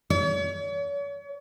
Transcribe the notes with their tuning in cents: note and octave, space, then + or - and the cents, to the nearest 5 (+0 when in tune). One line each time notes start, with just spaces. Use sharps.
C#5 +40